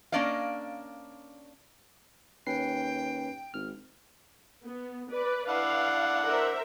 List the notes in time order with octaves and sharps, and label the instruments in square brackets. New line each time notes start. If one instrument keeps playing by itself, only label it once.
[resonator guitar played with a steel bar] A#3 C#4 D4 D5 D#5 F5
[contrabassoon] D#2 [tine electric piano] C#4 B4 C7 [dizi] G5
[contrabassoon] G#1 [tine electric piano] F6
[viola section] B3
B4 D5
[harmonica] D4 E4 F#5 [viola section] F5
[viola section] A#4 C5 E5